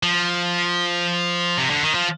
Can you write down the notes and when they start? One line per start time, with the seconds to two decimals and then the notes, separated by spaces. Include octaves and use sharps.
0.03 F3
1.58 C3
1.70 D3
1.82 D#3
1.95 F3